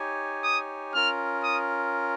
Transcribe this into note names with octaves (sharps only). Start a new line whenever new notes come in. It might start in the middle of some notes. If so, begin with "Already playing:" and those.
Already playing: D#4 G4 C#5 G#5
D#6
C#4 F4 A#4 F6
D#6